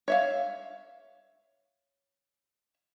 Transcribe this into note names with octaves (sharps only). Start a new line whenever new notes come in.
C#5 E5 F5